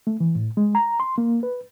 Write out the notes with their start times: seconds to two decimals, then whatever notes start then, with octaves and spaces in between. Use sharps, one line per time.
0.07 A3
0.20 E3
0.35 A2
0.57 G#3
0.75 A#5
1.00 C6
1.18 A#3
1.43 B4